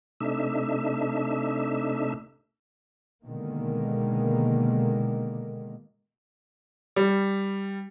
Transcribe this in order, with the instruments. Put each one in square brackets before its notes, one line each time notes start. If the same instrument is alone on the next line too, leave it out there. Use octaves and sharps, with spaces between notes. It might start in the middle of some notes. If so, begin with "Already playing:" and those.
[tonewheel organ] C3 A3 D4 D#4 E5
[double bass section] B2 D3 D#3 G#3 A#3
[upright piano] G3